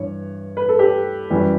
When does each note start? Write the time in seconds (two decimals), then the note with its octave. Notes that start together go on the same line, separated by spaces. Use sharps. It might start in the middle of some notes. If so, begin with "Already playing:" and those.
Already playing: G2 E3 C#5
0.57 B4
0.69 A4
0.79 G4
1.30 F#2 E3 G3